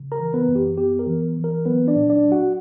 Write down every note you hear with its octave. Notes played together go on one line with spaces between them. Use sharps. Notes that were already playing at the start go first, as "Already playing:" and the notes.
Already playing: C#3
A#4 A#5
E3
B3 B4
F#2
G4
B3 G4
A#4
E3
E3
A#4
F#3 B3 B4
D4 D5
A#2
D4 D5
F#3
F#4 F#5